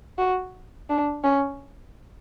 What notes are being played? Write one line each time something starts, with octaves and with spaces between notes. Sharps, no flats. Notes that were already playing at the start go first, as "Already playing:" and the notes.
F#4
D4
C#4